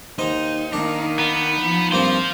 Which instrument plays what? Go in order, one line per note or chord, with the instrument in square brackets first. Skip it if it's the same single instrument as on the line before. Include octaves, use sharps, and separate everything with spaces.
[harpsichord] D#2 C5 [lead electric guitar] D#4
[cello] D#3 A#3 [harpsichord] D4
[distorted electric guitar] B3
[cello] F3
[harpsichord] G2 A#3 C4 [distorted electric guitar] F4 C5